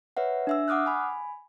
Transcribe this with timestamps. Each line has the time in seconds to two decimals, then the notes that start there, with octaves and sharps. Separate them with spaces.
0.17 B4 C#5 E5 F#5
0.47 D4 E5 E6
0.68 F#5 D6 D#6 F6 F#6
0.86 G#5 B5